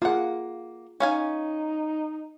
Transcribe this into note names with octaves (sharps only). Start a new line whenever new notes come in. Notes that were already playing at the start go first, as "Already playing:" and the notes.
A#3 F4 G#4 F#5
C#4 D#4 F5 G#5